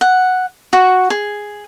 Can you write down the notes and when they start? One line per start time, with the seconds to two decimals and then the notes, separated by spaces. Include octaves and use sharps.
0.01 F#5
0.73 F#4
1.10 G#4